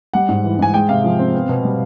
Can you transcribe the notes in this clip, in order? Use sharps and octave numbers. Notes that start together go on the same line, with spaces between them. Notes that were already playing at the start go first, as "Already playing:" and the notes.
G3 F#5
G#2
E3
G#2 G#5
G#3 G5
C3 F5
F3
C4
B3
B2
G3